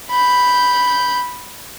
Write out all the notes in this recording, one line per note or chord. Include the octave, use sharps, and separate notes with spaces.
B5 G6